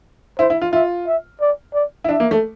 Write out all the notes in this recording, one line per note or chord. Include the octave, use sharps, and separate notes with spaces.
E4 C5
E4
F4
F4 E5
E5
D5
D5
E4
D4 E5
A#3
A3